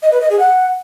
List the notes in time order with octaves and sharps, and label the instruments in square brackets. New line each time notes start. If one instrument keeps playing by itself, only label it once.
[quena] D#5
B4
D#5
G#4
F#5